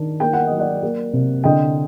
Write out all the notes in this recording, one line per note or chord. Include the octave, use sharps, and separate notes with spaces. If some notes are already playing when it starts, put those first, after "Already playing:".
Already playing: D#3 D4
A#3 G5
F#5
F#3 D#5
D5 F#5
A#3
C3
D3 D#5 G5